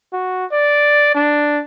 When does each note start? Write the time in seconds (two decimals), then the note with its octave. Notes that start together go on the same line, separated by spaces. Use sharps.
0.13 F#4
0.52 D5
1.15 D4